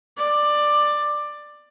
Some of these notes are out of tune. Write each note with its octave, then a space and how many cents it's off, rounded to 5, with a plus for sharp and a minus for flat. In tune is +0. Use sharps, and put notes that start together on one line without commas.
D5 +15